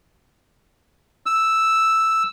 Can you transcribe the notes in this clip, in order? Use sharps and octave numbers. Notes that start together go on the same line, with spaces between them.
E6